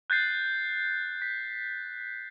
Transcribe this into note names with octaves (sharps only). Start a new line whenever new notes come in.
F#6 G6 A6 C7
B6